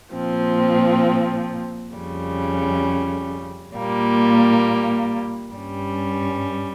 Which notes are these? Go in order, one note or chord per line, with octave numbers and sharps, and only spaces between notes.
A#2 F3 C4
F2 C#3 G3 C#4
A#2 G3 A#3
G2 G3 C#4